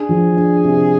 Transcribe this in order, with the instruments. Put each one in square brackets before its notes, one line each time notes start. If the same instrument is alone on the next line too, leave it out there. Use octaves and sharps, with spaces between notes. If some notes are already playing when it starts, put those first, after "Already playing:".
Already playing: [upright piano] D4 [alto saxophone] G#4
[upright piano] F3
D4
C3